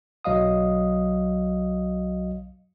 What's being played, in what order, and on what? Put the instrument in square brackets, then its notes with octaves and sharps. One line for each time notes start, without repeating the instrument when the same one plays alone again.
[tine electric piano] B1 F#3 D#5 F5 D#6